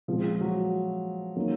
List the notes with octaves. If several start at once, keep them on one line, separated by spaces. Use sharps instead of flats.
A#2 F3 G#3 C4
F#3
F#3 A#3 D#4